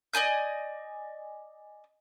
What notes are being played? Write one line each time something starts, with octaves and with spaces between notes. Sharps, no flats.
D5 D#5 G#5 G6